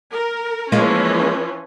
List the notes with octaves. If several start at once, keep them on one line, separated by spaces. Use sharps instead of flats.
A#4
E3 F3 G#3 A#3 C#4 F4